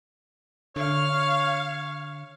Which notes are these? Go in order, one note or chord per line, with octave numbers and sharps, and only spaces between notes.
D3 C#5 F5